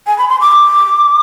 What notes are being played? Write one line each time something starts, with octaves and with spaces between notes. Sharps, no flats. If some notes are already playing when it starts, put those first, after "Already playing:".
G#5
B5
C6
D6